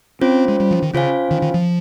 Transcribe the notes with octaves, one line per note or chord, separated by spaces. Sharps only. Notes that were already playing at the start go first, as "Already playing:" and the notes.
C4 C#4 F4 C5
G#3
G3
F3
D#3
C#3 C#4 F4 C5 F5 G#5
D#3
D#3
F3